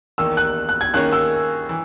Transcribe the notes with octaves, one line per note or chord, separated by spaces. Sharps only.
E2 D#3 A#3 E6
F#6
F#6
G#6
D#3 A#3 C#4 G#4 C#5 F#6
E6
E3